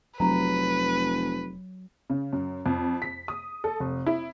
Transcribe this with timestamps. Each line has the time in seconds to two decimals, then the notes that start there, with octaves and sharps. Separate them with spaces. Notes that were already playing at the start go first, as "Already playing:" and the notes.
0.20 F1 F#3 B4 A#5
2.10 C#3
2.33 F#2
2.66 F2
3.02 B6
3.28 D#6
3.64 A4
3.80 F1
4.06 E4